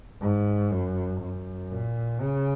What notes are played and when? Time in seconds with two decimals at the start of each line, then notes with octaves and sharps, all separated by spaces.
0.21 G#2
0.71 F#2
1.21 F#2
1.71 A#2
2.21 C#3